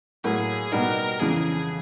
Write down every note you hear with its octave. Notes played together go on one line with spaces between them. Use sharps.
A2 F#3 A#3 G#4
B2 G3 B3 D#4 A#4
F2 C#3 E3 G#4